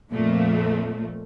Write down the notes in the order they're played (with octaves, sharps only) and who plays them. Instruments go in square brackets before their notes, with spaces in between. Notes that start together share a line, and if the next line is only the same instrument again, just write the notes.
[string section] F2 A#2 F3 A3